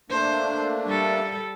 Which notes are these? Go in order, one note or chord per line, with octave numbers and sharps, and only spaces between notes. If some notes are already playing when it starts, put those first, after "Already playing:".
A3 A#3 D4 C5
G3 A4